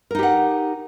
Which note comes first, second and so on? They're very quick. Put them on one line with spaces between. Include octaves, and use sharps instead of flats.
A#4 D#4 G4 F#5